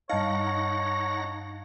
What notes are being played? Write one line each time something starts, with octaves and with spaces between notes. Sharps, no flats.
G2 D#4 C#5 D#5 F5 F#5 A5 A#6